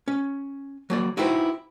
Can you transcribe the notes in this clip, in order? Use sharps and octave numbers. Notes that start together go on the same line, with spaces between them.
C#4
F#3 A#3 D5
D#4 E4 F#4 G4 B4 C5